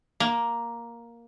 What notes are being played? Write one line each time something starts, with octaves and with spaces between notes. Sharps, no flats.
A#3